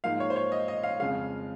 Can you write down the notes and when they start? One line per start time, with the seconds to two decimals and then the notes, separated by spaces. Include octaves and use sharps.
0.04 G#2 F3 A#3 F5
0.20 C#5
0.30 C5
0.36 C#5
0.52 D#5
0.68 D#5
0.83 F5
1.00 F2 C#3 G#3 F5